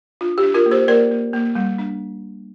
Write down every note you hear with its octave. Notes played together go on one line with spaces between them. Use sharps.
D4 F4
G4
D4
F4 A#4
A#3
G4 C5
A#3 A#4 D5
A#3
A#3
G3
D4